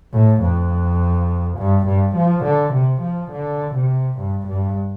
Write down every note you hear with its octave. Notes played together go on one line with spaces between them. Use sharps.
A2
F2
G2
G2
F3
D3
C3
F3
D3
C3
G2
G2